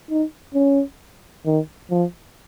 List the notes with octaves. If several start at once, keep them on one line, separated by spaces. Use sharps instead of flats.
D#4
C#4
D#3
F3